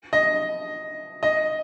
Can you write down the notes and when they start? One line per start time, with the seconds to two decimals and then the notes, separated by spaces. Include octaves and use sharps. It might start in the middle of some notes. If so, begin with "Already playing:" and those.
0.13 D#5
1.23 D#5